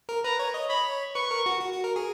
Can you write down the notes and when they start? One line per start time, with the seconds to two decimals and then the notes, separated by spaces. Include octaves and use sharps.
0.09 A#4
0.24 B4 A#5
0.39 C#5
0.54 D#5
0.69 C#5 B5
1.15 B4 C#6
1.31 A#4
1.46 F#4
1.61 F#4
1.72 F#4
1.84 A#4
1.96 G#4